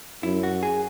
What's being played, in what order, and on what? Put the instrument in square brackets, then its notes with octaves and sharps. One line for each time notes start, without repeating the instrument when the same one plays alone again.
[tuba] F#2 [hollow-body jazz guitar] E4
[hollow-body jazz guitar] F#4
G#4